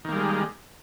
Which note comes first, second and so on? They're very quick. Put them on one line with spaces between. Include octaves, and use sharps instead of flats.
D#3 A#3 G3 G#3